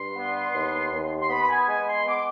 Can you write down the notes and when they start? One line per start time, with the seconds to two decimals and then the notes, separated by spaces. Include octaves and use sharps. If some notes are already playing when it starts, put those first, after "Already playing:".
Already playing: G2 C6
0.16 B3
0.55 D#2
0.93 D#2
1.20 C6
1.29 B3 B5
1.40 B5
1.49 G#5
1.67 G#3 G#5
1.87 C6
2.06 B3 D6